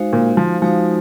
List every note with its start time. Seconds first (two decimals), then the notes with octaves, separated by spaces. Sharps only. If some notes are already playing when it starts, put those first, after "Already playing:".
Already playing: G#3 D#4 F#4 C5 F5
0.13 A#2
0.37 F3
0.62 F3 G#3 D#4 F#4 C5 F5